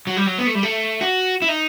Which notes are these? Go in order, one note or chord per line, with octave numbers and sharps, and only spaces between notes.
F#3
G3
F#3
B3
A3
G3
A3
F#4
E4
D#4